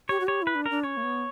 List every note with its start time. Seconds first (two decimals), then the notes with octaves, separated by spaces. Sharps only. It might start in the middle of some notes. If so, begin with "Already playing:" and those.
0.09 G4 C#5
0.20 F#4
0.27 G4 C#5
0.42 E4 B4
0.55 D4
0.66 D4 A#4
0.83 C#4 C#5
0.97 A#3
1.03 B3